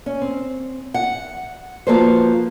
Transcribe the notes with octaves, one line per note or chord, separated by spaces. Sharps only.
C#4
C4
F#5
F3 A#3 F#4 A4 B4 C5